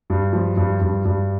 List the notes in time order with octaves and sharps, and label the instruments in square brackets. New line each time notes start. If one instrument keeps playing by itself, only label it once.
[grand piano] G2
F3
G2
G2
G2